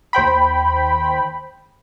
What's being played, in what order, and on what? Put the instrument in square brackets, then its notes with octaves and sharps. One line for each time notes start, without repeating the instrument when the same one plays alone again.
[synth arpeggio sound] D#2 C5 G5 B5